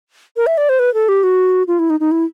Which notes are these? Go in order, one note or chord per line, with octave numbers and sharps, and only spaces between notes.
A#4
E5
D5
C5
B4
A4
G4
F#4
F4
E4
D#4
D#4
E4